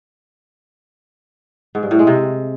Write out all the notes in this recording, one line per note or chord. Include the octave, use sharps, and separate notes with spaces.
G#2
G2
A2
G#3
C3